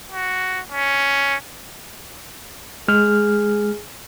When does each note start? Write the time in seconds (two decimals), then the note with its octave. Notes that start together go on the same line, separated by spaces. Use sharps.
0.12 F#4
0.72 C#4
2.88 G#3 G#4 F6